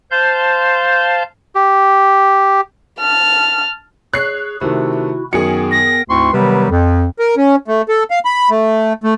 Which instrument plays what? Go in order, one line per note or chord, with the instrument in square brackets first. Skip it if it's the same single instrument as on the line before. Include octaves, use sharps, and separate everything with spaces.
[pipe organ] C5 F5 A5 C6 G6
[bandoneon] G4
[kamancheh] A5 F6
[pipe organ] G#4 [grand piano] C#5 [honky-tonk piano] F#6 C7
[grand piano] C3 D#3 A3 [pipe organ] E4 F#4
[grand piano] F#2 D#3 [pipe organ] B3 A#4 G5 [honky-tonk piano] G#4 C#7
[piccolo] A#6
[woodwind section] D2 G#2 C4 E4 C6 C#6
C3 D#3 F#3 G3 B3 B4
F2
[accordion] A#4
C#4
A3
A4
F5
B5
A3
A3